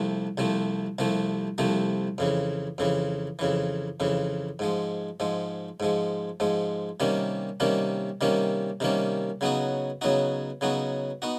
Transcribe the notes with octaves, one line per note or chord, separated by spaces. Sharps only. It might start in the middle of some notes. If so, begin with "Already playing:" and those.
Already playing: C2 C3 F3 A3
C2 C3 F3 A3
C2 C3 F3 A3
C2 C3 F3 A3
F2 C#3 E3
F2 C#3 E3
F2 C#3 E3
F2 C#3 E3
G#2 F3 G#3
G#2 F3 G#3
G#2 F3 G#3
G#2 F3 G#3
C3 D#3 G3 A#3 C#4
C3 D#3 G3 A#3 C#4
C3 D#3 G3 A#3 C#4
C3 D#3 G3 A#3 C#4
C#3 F#3 B3 D#4 F#4
C#3 F#3 B3 D#4 F#4
C#3 F#3 B3 D#4 F#4
B3 D#4 F#4